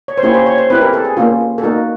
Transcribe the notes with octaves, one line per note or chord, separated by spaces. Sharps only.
C#5
C5
A#3 C#4 E4 G4 C#5
C5
C#5
C5
C4 E4 G4 B4
A#4
A4
G#4
A#3 C#4 F4
A4
A#3 D#4 F#4 A#4